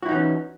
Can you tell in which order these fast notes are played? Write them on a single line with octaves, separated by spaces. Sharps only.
F#4 E4 D#4 E3 C#4